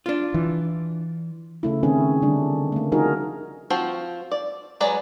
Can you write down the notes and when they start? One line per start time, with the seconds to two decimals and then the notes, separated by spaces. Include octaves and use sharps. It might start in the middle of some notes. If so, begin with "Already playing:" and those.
0.06 D4 F4
0.34 E3
1.63 C#3 A3 E4
1.83 D#3 C4 C#4 E4 G#4
2.22 D3 G3 D4
2.72 A3 A#3
2.92 F3 D#4 F#4 G#4 A#4
3.70 F3 C4 F#4
4.32 D5
4.81 F#3 G#3 B4 D5 A#5